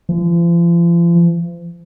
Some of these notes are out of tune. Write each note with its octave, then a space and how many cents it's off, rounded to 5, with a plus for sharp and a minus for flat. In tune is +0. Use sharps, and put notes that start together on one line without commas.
F3 -40